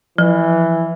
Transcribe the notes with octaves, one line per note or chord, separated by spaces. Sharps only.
E3 F3